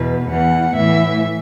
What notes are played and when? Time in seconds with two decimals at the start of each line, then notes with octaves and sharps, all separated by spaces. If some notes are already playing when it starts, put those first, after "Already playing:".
Already playing: E2 B2 B4
0.29 E2 E3 F#5
0.74 A2 E3 E5